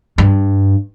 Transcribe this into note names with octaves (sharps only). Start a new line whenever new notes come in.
G2